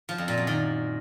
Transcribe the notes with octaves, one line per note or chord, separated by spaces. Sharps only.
F3
F2
A#2
F#2
D#3